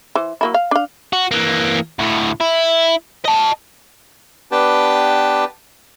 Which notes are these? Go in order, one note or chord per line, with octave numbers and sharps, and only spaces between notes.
E3 C5
F#3 A#3 E4
F5
D4 F5
F#4
E3 A#3
D2 A2
E4
D#5 A5
B3 D4 G4 B4 G5 A5